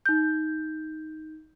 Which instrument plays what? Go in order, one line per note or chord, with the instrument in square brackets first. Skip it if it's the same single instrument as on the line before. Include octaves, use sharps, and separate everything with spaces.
[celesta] D#4 G6